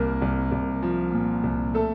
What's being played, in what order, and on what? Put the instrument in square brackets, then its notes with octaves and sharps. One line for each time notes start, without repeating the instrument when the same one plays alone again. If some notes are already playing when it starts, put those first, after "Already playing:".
Already playing: [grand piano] C2 A#3 A#4
C2
C2
F3
A#2
C2
A3 A4